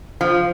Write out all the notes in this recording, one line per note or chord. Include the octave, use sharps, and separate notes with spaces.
F3